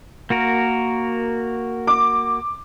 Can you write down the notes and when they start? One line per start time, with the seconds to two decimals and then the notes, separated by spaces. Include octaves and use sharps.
0.30 A#3 F#4 A#4
1.87 D6